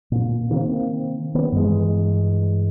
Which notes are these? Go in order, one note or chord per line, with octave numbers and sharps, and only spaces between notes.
A#2
C3 D#3 A#3 C4
D#3 B3
G2 E3 G#3